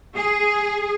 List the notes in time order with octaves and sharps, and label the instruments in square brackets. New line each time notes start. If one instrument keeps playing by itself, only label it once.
[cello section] G#4